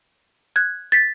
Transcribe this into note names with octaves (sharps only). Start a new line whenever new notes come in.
F#6 G#6
A6 B6